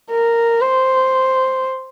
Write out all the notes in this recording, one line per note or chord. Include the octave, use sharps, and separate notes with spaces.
A#4
C5